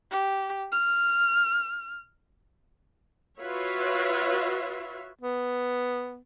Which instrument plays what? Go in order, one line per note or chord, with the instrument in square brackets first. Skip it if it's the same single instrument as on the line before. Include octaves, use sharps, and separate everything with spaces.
[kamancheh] G4
F6
[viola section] F4 F#4 B4 C#5 E5
[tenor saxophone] B3